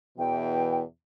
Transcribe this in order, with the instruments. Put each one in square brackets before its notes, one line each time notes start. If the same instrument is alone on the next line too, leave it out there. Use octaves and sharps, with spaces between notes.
[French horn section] E2 B2 E3 [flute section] G5